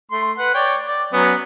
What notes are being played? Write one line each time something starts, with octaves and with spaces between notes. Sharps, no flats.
A3 C6
B4 F#5
C#5 D5 G5
D5
F#3 B3 C#4